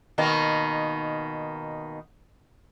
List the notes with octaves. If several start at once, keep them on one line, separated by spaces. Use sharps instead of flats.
B2 D#3 A#3